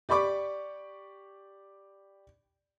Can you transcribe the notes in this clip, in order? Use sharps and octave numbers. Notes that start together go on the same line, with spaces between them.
G4 D5 B5 C#6 D6